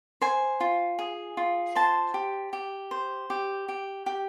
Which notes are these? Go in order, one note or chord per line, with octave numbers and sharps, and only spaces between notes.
C5 G#5
F4
G#4
F4
C5 A5
G4
G4
C5
G4
G4
G4